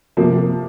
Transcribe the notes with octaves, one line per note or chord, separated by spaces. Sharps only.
C3 F3 A#3